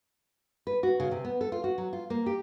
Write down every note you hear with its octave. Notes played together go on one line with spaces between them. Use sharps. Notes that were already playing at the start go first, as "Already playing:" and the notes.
B4
F#4
C#3
C3
B3
A4
F4
F#4
F#3
F4
A#3
G4